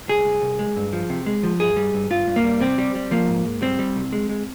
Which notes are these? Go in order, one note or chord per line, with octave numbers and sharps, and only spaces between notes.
C2 G#4
C2
C2
G#3
G2
F3
C3
G#3
F3
G2 G#4
G3
G2
G2 F4
G2
A#3
G3
C3 C4
G3
G3
F3 A#3
G#2
G#2
G3 C4
G3
C2
G#3
G#3